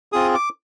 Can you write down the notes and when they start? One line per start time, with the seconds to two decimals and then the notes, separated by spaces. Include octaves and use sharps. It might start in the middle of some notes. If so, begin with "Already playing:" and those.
0.12 C4 F4 G#4 D#6
0.34 D6